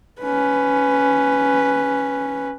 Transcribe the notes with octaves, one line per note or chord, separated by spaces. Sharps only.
C#4 B4